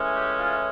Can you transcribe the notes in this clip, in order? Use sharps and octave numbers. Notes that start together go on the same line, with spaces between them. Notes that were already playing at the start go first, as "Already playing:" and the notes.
Already playing: A2 E3 G#3 C#4
G4
F4